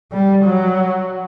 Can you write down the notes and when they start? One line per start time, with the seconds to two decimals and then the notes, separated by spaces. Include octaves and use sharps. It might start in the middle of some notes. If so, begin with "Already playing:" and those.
0.12 G3
0.45 F#3